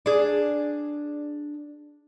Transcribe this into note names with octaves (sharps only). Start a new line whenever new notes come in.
D4 G#4